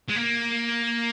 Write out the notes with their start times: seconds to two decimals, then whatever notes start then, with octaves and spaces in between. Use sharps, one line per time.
0.09 G#3
0.16 A#3